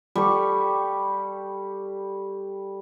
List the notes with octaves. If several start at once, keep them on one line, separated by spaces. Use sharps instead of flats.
G3 A4 C#6